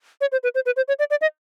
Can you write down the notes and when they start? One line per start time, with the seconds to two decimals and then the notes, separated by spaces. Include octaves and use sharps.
0.21 C#5
0.32 C5
0.43 B4
0.55 C5
0.66 B4
0.77 C5
0.88 C#5
0.99 D5
1.11 D5
1.21 D#5